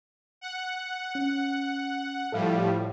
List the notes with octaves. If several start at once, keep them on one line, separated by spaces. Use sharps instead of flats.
F#5
C#4
A2 F3 G3 A4 F5